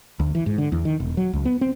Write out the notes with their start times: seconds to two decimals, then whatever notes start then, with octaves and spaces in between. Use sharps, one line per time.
0.20 D2
0.35 E3
0.46 G#2
0.58 D3
0.72 E2
0.85 D#3
1.00 E1
1.17 F#3
1.33 C#2
1.45 B3
1.61 C4